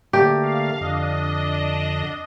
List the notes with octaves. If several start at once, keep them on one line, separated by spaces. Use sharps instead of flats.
D3 A3 A#3 G4
F5
F2 D3 D4 D#5